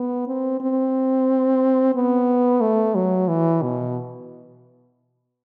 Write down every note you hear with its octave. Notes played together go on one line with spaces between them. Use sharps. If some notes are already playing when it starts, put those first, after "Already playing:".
Already playing: B3
C4
C4
B3
A3
F#3
E3
B2